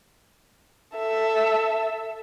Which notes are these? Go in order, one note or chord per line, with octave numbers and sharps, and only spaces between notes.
A4 E5